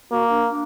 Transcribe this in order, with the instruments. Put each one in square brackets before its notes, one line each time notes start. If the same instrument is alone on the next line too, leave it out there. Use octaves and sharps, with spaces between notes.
[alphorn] A#3 [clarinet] F#4
[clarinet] D4
D4